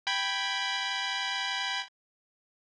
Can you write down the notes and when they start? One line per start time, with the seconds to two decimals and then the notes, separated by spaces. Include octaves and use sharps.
0.07 G5 B5 G#6